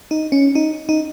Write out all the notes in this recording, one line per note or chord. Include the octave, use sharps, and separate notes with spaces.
D#4
C#4
D#4
D#4